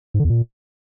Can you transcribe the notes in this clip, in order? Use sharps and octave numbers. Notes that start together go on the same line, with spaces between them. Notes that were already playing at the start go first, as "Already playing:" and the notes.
G#2
D3
E2
A#2